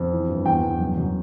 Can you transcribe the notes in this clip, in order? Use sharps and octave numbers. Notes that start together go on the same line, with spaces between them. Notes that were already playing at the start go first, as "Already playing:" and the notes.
Already playing: F2
E3
G2
E2 G5
E2
F#2
F#2